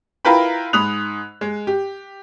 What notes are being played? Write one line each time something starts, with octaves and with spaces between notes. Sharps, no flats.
E4 F4 A#4 B4 G5 B5
G#2 B5 D#6 F#6 F7
G#3
G4